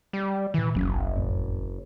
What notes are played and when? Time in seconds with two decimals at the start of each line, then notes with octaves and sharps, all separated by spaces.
0.13 G3
0.54 A#2 D#3 E3
0.75 F#1 D#2 F#3 C#4
0.88 B1
1.16 A1 F2